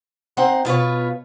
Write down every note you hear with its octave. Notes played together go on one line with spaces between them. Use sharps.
C4 D#4 C5 F#5
B2 F4 B4 C#5